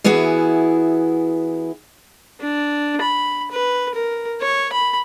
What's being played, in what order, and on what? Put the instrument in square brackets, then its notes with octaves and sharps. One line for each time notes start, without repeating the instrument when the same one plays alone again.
[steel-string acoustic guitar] E3 B3 E4 F#4 G#4
[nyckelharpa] D4
B5
B4
A#4
C#5
B5